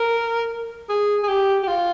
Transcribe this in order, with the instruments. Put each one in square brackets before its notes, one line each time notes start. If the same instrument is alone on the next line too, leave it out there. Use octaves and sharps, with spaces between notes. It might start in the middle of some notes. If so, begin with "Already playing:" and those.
Already playing: [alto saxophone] A#4
G#4
G#4
G4
G4
F4